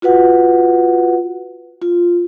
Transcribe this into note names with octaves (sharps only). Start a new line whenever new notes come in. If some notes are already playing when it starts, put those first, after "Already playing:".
F4 F#4 B4 F#5
F4